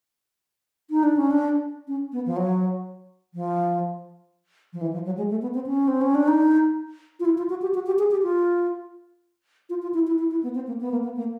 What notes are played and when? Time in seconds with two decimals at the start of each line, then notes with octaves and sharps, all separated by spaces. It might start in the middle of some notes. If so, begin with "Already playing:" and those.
0.90 D#4
1.03 D4
1.17 C#4
1.31 D4
1.88 C#4
2.12 B3
2.26 F3
2.36 F#3
3.34 F3
4.73 F3
4.81 E3
4.93 F3
5.06 F#3
5.18 G#3
5.30 A3
5.42 B3
5.54 C4
5.66 C#4
5.88 C4
6.01 C#4
6.15 D4
6.28 D#4
7.20 F4
7.25 E4
7.38 F4
7.49 F#4
7.62 G4
7.74 F#4
7.86 G4
7.99 G#4
8.11 G4
8.23 F4
9.70 F4
9.82 F4
9.94 E4
10.07 E4
10.19 E4
10.31 E4
10.43 B3
10.55 C4
10.67 A#3
10.81 B3
10.92 A#3
11.04 B3
11.17 A#3